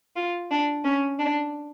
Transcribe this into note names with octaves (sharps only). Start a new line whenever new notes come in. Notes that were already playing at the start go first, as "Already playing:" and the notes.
F4
D4
C#4
D4